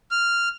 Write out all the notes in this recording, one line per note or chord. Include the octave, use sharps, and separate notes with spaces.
F6